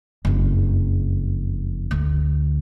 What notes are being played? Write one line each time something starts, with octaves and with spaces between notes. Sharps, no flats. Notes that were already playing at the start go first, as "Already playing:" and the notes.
F#1 F2
D2